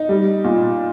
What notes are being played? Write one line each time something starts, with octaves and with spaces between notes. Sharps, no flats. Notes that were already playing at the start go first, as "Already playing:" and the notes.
Already playing: D#4
G3
A#2